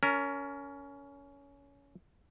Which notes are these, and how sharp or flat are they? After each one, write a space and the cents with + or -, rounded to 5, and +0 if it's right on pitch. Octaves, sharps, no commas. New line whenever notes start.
C#4 +20 A#4 -10